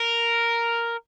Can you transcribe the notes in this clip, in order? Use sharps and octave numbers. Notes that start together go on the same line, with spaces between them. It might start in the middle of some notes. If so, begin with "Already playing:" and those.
Already playing: A#4